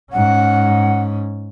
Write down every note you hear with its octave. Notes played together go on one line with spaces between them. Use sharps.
G#2 C#4 F#5